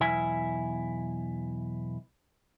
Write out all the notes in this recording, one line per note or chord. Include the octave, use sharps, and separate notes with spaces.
B1 E2 E4 G#5